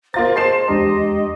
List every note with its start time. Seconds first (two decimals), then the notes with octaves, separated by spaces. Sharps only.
0.14 A#3 F4 C5 A#5 C6 A6
0.36 G#4 C5 D#5 A5 C6 C7 E7
0.68 E2 G#3 D4 G4 D#5 A#5